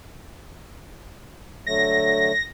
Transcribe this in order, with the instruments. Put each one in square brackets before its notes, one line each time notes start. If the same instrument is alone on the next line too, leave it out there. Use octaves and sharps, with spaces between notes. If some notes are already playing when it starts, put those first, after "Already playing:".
[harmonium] D3 F#3 A3 [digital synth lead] A#6